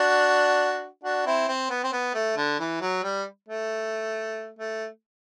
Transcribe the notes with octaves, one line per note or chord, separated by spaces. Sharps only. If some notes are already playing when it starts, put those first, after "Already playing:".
Already playing: D4 F#4
D4 F#4
C4 E4
C4
B3
C4
B3
A3
D3
E3
F#3
G3
A3
A3